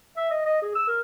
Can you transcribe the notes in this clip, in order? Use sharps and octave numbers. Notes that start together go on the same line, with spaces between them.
E5
D#5
D#5
G#4
E6
A#4